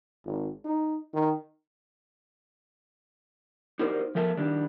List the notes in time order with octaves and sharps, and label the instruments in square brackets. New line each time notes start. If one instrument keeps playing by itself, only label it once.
[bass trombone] G#1
D#4
D#3
[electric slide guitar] D#4 F#4 G4 A#4 C5 D5
F3 A3 A#4 E5 A5
D#3 G3 D4